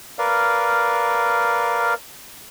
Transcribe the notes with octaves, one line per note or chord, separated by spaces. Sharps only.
A#4 B4 D5 F5